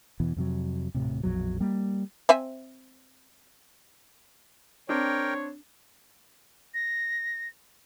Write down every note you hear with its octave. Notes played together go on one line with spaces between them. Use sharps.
E2 B2 E3
F2 C3 F#3
D#1 A#1 A2 C3
A#1 F2 B2 F#3
G3 A#3
C4 E5 G#5
C4 D4 A#4 C#5 G5
A#6